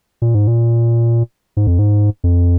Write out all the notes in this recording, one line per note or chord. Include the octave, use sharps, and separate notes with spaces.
A#2
G#2
A#2
G#2
F2
G#2
F2